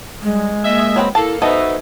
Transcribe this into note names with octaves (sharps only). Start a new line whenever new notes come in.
G3 G#3
A#3 D#5 E5
F#3 C4 B4
A#3 E4 A4 A5
B2 B3 D#4 A4 C5 D#5 E5